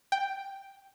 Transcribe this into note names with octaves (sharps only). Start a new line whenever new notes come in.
G5